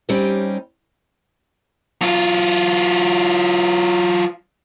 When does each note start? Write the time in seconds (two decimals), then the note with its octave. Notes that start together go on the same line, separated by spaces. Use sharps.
0.09 G3 C4 C#4 D#4 G4
2.02 F#3 F4